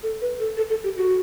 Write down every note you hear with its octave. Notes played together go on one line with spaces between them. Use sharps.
A4
B4
A4
A4
A4
G4
F#4